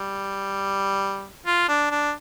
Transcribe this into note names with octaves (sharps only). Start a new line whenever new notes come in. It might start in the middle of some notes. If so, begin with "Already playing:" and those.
Already playing: G3
F4
D4
D4